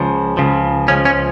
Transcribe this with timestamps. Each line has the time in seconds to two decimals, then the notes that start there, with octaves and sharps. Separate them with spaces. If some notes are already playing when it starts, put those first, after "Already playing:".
Already playing: C#2 C#3 F3
0.37 C#2 C#3 F3
0.88 C#2 C#3 F3 C#4
1.05 C#4